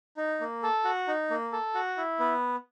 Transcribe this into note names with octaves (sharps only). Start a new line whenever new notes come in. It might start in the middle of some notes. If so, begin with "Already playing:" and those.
D#4
A#3
A4
F#4
D#4
A#3
A4
F#4
E4
B3